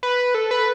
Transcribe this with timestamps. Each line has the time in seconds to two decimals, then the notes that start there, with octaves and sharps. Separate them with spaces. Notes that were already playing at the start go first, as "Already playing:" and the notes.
0.03 B4
0.35 A4
0.51 B4